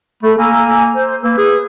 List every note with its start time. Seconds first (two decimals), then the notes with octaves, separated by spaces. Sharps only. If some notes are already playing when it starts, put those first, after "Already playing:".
0.23 A3 A4 B5
0.38 A#3 G#5 A#5 E6
0.95 C5 G6
1.23 A#3 B4 E6
1.38 G#4